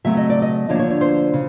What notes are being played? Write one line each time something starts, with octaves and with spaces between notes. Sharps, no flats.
C#3 F#3 A3 C4 E5
D#5
D5
D#5
D2 D3 F3 A#3 D4 C#5
C#5
C#5
C5
C#3